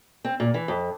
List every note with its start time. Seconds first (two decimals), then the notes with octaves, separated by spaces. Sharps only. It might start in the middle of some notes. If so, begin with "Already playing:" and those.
0.25 C4
0.40 A#2
0.54 E3
0.68 F2